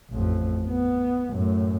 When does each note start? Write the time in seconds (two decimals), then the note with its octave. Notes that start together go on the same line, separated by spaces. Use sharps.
0.10 A1 F2
0.66 B3
1.31 F#2 A2